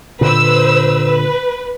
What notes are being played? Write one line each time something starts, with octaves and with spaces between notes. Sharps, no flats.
A#2 D3 B4 C5 E6
B4